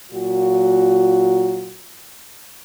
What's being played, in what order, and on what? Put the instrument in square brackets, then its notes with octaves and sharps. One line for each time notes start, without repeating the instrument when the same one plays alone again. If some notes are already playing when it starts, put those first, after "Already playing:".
[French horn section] A#2 F#3 F4 F#4